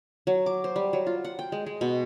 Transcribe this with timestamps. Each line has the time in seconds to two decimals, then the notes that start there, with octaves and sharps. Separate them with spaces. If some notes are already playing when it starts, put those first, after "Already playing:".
0.27 F#3
0.46 D6
0.64 C5
0.76 G3
0.93 F#3
1.07 F4
1.24 F#5
1.39 G5
1.52 G#3
1.66 G#3
1.81 B2